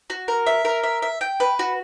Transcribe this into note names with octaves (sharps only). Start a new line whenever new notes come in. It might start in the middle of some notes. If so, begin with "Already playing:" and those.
F#4
A#4
E5
A#4
E5
E5
G5
B4
F#4